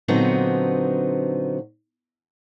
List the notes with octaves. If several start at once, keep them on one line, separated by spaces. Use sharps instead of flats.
A#2 D3 F#3 B3 C4 D#4